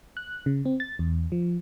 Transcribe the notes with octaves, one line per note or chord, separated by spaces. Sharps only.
F#6
C#3
C4
A6
E2
F3